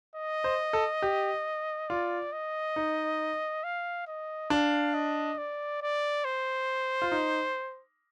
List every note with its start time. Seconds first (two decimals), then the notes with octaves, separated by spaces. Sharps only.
0.15 D#5
0.44 C5
0.73 A4
1.02 G4
1.89 F4 D5
2.33 D#5
2.76 D#4
3.63 F5
4.07 D#5
4.50 D4 F5
4.94 D#5
5.38 D5
5.82 D5
6.25 C5
7.02 F4
7.12 D#4